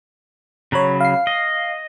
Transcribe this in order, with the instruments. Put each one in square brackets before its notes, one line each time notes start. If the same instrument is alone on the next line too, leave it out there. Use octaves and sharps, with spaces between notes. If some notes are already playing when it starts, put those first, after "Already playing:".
[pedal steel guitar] C#3 F#3 B5 [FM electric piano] C#5 A#5
[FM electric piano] F5 C7
[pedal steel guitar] D#5